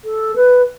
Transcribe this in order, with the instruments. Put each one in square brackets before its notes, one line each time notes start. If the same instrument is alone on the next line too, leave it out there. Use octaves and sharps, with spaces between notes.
[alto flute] A4
B4